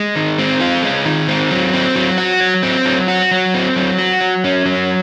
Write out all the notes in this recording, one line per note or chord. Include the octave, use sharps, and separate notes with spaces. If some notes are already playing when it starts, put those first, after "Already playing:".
Already playing: G#3
D#3
C4
F4
G#3
D#3
C4
F#3
C4
F#3
F#4
F#3
C4
F#3
F#4
F#3
C4
F#3
F#4
F#3
C#4
F#3